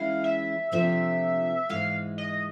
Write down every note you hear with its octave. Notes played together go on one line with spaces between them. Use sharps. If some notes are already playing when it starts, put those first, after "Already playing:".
Already playing: E3 G#3 C#4 E4 F5
E5
C3 F3 A3 D4 F4 E5
G#2 E3 G#3 F5
D#5